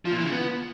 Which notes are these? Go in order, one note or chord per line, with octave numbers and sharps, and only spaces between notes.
F3
A#2
E3
C#3
B3